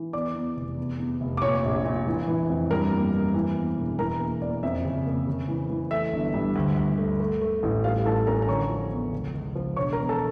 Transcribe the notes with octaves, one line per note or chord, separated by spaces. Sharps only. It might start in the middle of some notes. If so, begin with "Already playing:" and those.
Already playing: E3
E2 D5 D6
E2
F1
E2
E2
F1
D6
A#2 C#5 C#6
A#1
A#2
E3
E3
F2
G2 A#4 A#5
A#3
A#3
E3
E2
E1
E3 A#4 A#5
A#3
A#3 D5
F2 E5
C#3
A#3
C#3
E3
E3
A3 E5
G1
G2
D2
D2
A3
A3
A3
A1
G3 F4 F5
A1 A4 A5
C#4 A#4 A#5
A#5
D3 C#5 C#6
F3
E2
C#2
C#2
F3
E1 C#5 C#6
A#4 A#5
E2
A4 A5